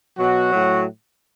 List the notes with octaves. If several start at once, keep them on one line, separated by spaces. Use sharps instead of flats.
B2 F#3 F#4
A2 F#3